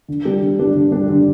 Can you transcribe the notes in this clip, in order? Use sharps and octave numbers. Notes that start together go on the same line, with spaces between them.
D3
G3 D4
D3
G3 D4
D3
G3 D4
D3